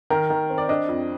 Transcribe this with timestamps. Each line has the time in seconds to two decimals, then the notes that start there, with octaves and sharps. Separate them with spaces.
0.10 D#3 A#4
0.30 D#3
0.50 C4
0.58 D5
0.69 D4 D#5
0.89 F2